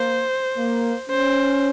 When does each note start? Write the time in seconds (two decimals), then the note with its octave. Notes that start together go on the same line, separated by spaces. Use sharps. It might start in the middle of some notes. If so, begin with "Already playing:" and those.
Already playing: A#3 C5
0.57 A#3
1.10 C#4 C5